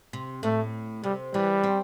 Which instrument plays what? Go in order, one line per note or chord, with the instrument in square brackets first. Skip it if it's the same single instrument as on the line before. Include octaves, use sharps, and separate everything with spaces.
[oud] C3
[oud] A2 [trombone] A3
[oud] C3 [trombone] G3
[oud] E3 [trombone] G3
[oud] C4